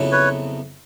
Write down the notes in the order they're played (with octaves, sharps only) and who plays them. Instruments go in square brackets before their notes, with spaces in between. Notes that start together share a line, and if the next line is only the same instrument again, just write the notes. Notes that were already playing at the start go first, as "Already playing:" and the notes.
Already playing: [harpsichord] F2 C#3 F#3 B3 E4
[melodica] B4 C#5